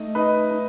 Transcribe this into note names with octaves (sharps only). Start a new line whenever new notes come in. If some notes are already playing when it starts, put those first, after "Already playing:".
Already playing: A3 D#4 D#5
D#4 B4 D#5
D#4